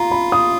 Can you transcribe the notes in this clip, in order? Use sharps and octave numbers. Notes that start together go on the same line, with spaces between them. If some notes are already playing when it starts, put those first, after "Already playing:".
Already playing: F4 A#5
B5
D#6